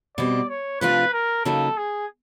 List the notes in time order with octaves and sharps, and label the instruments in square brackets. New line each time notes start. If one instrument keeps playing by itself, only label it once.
[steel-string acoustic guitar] B2 G3 C4 [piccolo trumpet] D5
[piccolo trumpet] C#5
[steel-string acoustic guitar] C3 F3 A3 D4 F4 [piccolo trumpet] B4
[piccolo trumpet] A#4
[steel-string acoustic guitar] C#3 F#3 A#3 D#4 [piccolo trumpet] A4
[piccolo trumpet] G#4